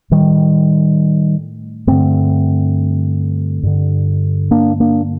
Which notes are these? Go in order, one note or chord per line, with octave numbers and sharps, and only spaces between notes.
A2 D#3 G3
G2 D3 A3 C4
G2 D3
A#3 D4
A#3 D4